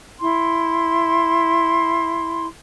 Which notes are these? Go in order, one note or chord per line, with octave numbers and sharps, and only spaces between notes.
E4 C6